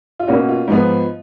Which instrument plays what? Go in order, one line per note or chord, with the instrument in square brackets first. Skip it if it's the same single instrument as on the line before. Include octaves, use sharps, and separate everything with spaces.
[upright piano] F4
B2 A#3 C#4 F#4
F4
G#2 F3 B3